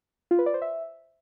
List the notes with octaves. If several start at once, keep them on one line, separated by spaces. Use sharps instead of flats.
F4
B4
D5
C5
E5